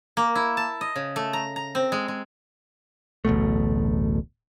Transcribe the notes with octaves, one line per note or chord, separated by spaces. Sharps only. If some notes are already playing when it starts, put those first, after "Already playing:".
A#3
E4
A5
D#5
C#3
A3
A#5
A#5
C4
G#3
G#3
D1 A1 B2 A3